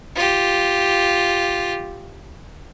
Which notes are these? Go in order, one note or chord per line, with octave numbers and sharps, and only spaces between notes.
F4 G4